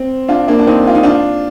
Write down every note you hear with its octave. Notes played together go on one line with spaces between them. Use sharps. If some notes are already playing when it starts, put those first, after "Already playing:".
Already playing: C4
D4 F4
A#3 D4
D4
C4 D#4
F4
D#4
D4 F4